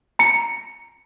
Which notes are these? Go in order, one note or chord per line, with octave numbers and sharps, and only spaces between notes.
A#5 C#7